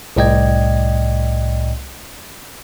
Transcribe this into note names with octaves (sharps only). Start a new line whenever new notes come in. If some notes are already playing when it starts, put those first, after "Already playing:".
C2 A2 D5 D#5 G5 G#6